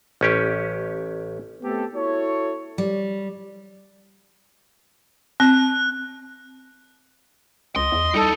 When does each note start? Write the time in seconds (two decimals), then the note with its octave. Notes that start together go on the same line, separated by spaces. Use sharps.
0.21 A1 C#4 G4
1.62 A3 B3 C4 G4 A4
1.95 E4 F#4 A4 C#5
2.78 G3
5.40 C4 F#6
7.76 C#2 D#5 C6
7.92 E2
8.14 G3 D#4 E4 A4